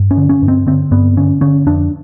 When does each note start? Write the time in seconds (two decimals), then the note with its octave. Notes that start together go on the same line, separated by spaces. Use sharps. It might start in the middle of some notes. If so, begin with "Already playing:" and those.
Already playing: G2
0.11 C#4
0.17 D3
0.29 C#4
0.42 G2
0.48 C4
0.67 D3 C4
0.91 G2 B3
1.17 D3 C#4
1.41 D3 C#4
1.66 F2 D4